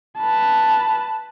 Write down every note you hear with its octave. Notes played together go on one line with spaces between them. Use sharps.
B4 A5